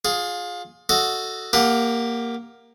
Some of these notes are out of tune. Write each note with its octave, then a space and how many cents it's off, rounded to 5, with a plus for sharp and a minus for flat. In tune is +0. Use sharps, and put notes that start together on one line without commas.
F4 +25 G#4 +0
F#4 +0 A4 +0 D#5 +0
A#3 +0 G4 +25 F#5 +0